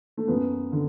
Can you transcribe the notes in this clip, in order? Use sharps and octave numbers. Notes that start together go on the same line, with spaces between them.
A3
F#2 B3
D3